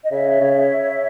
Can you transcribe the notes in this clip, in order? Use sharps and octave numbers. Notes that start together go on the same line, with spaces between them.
D#5
C#3 C#5 E5
C#3